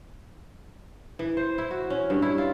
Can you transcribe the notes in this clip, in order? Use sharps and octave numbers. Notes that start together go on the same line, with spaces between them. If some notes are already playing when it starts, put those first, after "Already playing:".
E3
C5
E4
F#4
C#4
G2
E4
F4